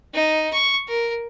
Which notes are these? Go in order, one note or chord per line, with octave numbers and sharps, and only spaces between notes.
D#4
C#6
A#4